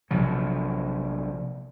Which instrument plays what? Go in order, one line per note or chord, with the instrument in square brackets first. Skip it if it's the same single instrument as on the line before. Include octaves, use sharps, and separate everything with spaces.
[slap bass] A#1 C3 F3 F#3